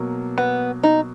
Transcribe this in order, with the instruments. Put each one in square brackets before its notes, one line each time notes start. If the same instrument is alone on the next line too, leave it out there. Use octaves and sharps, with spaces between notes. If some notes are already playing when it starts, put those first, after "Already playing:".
Already playing: [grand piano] B2 F#3 A#3
[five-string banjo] B3
D#4